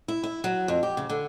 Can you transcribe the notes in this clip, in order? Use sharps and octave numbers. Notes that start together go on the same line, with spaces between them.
E4
E4
F#3
F2
G4
C#3
D3